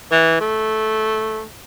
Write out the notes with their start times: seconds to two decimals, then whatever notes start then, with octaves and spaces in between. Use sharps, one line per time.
0.12 E3
0.40 A3